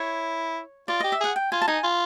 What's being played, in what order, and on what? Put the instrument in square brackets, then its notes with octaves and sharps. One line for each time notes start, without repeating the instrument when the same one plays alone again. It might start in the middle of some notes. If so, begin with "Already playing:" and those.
Already playing: [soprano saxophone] E4 [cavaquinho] C#5
[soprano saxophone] F4 [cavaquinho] D5
[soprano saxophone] G4 [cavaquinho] D#5
[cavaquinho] E5
[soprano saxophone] G#4 [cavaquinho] F#5
[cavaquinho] G5
[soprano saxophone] F4 [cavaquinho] G#5
[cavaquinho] A5
[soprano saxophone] D#4 [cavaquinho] G#5
[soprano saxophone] F4